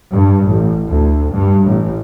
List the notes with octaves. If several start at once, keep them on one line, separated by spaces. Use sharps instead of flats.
G2
A1
D2
G2
A1